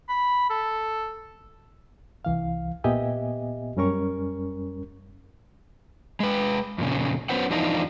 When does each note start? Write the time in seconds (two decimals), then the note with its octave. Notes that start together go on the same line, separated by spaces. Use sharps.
0.09 B5
0.50 A4
2.25 C2 E3 F5
2.84 A#2 B3 G4 D#5 E5 G#5
3.77 F#2 G3 C#4 A#4 C#6
6.20 G#3 B4
6.78 F2 A#2 C#3
7.29 F#3 B3 C#4 B4 C5 F#5
7.50 E2 E3 F3 D4 D#4 F4